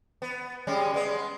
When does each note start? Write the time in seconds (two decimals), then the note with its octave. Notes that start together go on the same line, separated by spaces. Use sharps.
0.22 B3
0.67 G3 G#3 C#4
0.94 G#3 B3